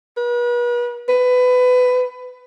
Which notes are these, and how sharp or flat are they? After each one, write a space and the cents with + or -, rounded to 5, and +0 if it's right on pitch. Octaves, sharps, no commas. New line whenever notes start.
B4 -40
B4 +20